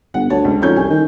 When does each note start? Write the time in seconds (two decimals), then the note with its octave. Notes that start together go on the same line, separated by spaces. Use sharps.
0.14 G1 F#5
0.30 D2 C#5 A5
0.45 C#2
0.62 F2 C#4 D#4 G6
0.76 C2 G#5
0.89 D#3